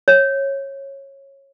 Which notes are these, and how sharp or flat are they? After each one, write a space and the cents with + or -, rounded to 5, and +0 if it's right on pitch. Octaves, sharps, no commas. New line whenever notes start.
C#5 -15